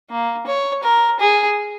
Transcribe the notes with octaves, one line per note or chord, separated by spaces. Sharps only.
A#3
C#5
A#4
G#4